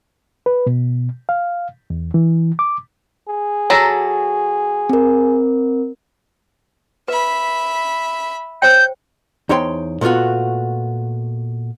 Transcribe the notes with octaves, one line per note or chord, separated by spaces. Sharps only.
B4
B2
F5
E2
E3
D6
G#4
F#3 A4 A#5
C4 A#4
B4 E5 B5
C5 C#5 G5 G6
E2 D#4 C5 C#5 G5 C6
A#2 A3 B3 F4 F#4